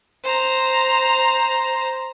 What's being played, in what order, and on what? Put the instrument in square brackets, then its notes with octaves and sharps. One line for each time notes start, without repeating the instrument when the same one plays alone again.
[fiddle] C5 A#5